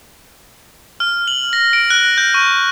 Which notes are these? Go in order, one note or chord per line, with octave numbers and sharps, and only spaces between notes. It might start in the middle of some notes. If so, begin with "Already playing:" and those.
F6
F#7
A#6
D7
F#6
G6
C#6